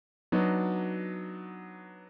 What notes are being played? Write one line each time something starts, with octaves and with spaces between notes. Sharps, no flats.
F#3 B3 D4 D#4 F#4